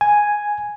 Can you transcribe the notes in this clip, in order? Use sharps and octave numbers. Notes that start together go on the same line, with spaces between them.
G#5